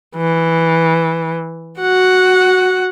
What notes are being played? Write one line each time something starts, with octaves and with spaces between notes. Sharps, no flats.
E3
F#4 F#5